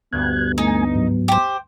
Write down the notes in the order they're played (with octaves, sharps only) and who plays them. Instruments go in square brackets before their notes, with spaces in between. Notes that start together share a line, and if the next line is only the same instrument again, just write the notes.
[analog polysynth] D2 G2 [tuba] B3 [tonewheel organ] F#6 G#6
[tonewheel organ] A3 G#5 [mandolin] D#4
[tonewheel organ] G#2 F#3
[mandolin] G4 C5